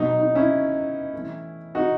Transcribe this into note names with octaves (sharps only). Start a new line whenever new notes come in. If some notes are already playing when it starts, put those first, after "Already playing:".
Already playing: B2 F#3 D#4
D#4
C#4 E4
A2 E3
D#4 F#4